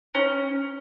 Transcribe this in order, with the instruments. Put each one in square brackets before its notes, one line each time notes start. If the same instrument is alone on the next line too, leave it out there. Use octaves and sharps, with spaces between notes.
[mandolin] C#4